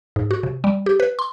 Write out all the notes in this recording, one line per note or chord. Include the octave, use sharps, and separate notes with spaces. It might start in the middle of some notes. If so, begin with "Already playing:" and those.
G#2
F#4
C3
G3
G4
B4
C6